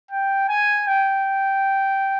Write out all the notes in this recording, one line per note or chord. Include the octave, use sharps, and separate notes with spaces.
G5
G#5
G5